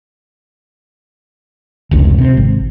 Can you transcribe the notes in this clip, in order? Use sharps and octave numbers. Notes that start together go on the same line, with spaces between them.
F1 C#2
C3
G#1